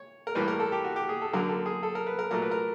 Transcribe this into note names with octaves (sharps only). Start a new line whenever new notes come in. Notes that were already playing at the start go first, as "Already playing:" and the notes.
Already playing: C#5
A#4
A2 E3 G3 A#3 B4
A#4
A4
G4
F#4
G4
G#4
A4
F#2 D3 F#3 A#3 A#4
A4
G#4
A4
A#4
B4
A#4
A#2 F#3 A3 A#4
B4
A#4